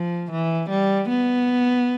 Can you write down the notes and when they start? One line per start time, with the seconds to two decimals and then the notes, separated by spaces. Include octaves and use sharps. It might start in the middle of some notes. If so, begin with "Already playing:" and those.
Already playing: F3
0.31 E3
0.70 G3
1.09 B3